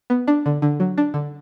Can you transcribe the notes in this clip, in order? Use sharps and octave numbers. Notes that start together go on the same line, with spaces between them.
B3
D4
D3
D3
F#3
D4
D3